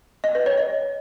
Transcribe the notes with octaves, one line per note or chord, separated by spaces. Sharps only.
D#5
B4
C#5
D#5